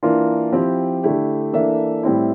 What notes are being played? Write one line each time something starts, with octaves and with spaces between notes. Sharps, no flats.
E3 A#3 D4 F4 A#4
F3 C4 E4 G4
D3 A3 E4 G4
E3 A#3 D4 A4 E5
A2 G3 C4 E4